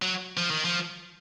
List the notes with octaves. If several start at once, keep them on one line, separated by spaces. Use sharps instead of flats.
F#3
F3
D#3
F3